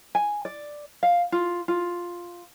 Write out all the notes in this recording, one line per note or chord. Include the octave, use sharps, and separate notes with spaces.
G#5
D5
F5
F4
F4